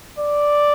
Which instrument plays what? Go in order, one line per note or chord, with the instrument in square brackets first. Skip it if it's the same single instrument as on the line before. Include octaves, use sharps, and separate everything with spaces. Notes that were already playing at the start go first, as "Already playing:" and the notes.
[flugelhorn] D5